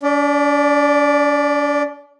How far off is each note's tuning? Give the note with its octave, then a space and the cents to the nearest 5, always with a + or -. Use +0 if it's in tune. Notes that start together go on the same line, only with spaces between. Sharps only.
D4 -45 D5 +5